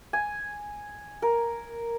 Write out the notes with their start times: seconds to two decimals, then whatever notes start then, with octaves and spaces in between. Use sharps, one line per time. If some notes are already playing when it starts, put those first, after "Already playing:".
0.13 G#5
1.22 A#4